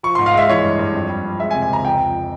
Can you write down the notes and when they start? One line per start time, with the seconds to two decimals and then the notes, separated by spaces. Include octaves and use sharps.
0.03 F3 C#6
0.15 G#2 C6
0.26 F5
0.34 G#3 E5
0.48 E3 C#5
0.64 G2
0.79 G2
0.94 F2
1.10 G3
1.24 F2
1.39 G#3 E5
1.51 G#5
1.55 C3
1.62 G#5
1.69 C#2 A#5
1.85 F2 G5
2.00 F2